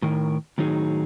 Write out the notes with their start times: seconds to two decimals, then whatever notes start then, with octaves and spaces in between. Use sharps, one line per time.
0.02 A2 D#3 A#4
0.58 A2 D#3 F#3 D#4 G#4